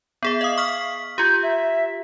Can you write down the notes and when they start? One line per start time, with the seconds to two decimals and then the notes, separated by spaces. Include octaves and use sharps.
0.23 B3 G#4 E5
0.41 D#5 F5 D#6
0.57 C#6 F6 B6
1.18 F4 G4 G6
1.43 E5